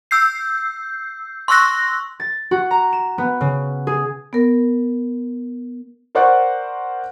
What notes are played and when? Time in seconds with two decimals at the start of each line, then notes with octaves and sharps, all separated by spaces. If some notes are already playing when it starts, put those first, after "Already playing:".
0.11 E6 G6 C7
1.48 C6 C#6 E6 F#6 A#6
2.20 A6
2.51 F#4
2.71 A#5
2.93 E7
3.18 B3
3.41 C#3
3.87 G#4
4.33 B3 A#4
6.15 A#4 C5 D5 F#5 C#6 F#6